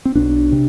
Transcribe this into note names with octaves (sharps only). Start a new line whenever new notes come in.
C4
B1 B2 D4
C3